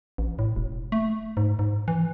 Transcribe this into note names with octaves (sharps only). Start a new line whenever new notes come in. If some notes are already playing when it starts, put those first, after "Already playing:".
A1
A2
E1
A3
G#2
G#2
E3